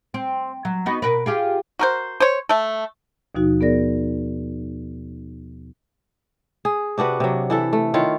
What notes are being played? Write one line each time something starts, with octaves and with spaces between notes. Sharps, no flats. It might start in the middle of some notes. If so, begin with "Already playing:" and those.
C4
F#3
B3 D#4 F#4
B2 A#4 B4
F4 G4 G#4
F#4 A#4 C5
C5 C#5
A3 A4
D#2 B2 F3 D#4 F#4
B3 G#4 A#4 D5 A#6
G#4
C3 D4 F#4 B4
C3 F#3
E3 E4 A4
A3
D#3 E4 F4 C#5